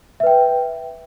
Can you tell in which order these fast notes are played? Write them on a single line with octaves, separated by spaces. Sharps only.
E5 B4 G5